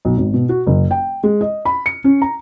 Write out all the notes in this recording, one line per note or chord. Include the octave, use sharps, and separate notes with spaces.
B1
G#1
B2
F#4
F#1
G5
G#3
D#5
B5
C#7
C#4
A#5